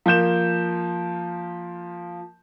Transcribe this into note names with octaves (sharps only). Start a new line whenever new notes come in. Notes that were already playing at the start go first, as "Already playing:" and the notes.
F3 A#3 G6 E7